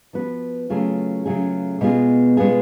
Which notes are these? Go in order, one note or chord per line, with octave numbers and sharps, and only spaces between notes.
F3 B3 F#4 B4
C#3 F#3 A3 F4 G#4
C#3 F#3 A3 F4 G#4
B2 G#3 B3 F4 G#4
B2 G#3 B3 F4 G#4